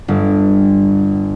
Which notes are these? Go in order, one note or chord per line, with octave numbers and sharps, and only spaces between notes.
G1